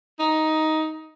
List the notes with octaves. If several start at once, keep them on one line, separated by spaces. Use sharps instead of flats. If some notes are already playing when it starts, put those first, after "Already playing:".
D#4